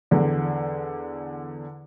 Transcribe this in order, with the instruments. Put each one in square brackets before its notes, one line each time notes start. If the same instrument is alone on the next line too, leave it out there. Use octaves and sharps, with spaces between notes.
[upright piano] E2 D3